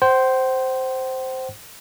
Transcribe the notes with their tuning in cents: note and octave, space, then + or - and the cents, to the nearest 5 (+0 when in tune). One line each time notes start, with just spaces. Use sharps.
C5 +0 G5 -45